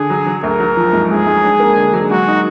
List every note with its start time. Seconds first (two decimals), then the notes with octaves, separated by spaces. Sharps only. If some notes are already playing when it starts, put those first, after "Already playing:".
Already playing: D3 G#4
0.10 F#3
0.26 F#3
0.43 D2 A#4
0.60 F#3
0.77 F3
0.93 G#2
1.09 G#2 G#4
1.26 G#2
1.43 D4
1.60 A#3
1.76 D3
1.93 F#3
2.10 G#3 F#4
2.28 D#4